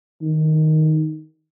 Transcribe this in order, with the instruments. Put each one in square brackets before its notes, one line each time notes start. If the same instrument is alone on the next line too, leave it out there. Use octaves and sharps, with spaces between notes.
[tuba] D#3